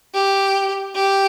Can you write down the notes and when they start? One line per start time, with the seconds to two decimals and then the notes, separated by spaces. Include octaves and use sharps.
0.14 G4
0.95 G4